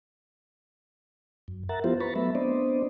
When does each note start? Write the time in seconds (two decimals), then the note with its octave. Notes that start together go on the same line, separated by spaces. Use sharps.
1.48 F#2
1.69 A#4 E5 F#5 A#5 A6
1.84 F3 B3 E4 F4 G4 C5
2.00 B4 A#5 B5 C#6 A6
2.16 F#3 A3 B3 E5 B5
2.35 B3 C4 D4 C5 D5 D#5